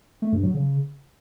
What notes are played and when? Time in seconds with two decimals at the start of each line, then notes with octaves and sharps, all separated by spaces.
0.22 A3
0.33 G2
0.43 F#3
0.54 C#3